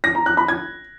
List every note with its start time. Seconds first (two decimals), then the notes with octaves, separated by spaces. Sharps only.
0.04 A#6
0.15 A#5
0.26 F#6
0.37 B5
0.48 G#6